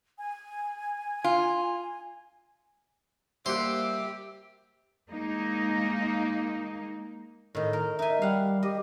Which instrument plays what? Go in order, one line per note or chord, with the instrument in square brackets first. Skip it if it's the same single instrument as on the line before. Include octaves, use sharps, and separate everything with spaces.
[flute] G#5
[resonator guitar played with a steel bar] F4
[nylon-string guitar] G3 A#3 F#5 [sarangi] G4 [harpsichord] C5 [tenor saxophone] E5
[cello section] G#3 A#3 D#4
[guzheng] A2 D#3 [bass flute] D#5
[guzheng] A#4
[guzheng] D#4 G#5 [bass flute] E5
[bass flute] G3 [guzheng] F5 F#5
[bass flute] G4 [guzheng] D#5